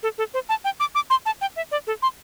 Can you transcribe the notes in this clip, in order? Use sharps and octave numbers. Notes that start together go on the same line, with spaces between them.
A4
A4
C5
A5
G5
D6
D6
C6
A5
G5
E5
D5
A4
C6